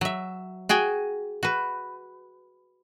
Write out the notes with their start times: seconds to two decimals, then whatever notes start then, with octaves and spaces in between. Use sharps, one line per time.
0.01 F#3 E5
0.69 F#4 G#4 G5 G#5
1.43 F#4 B4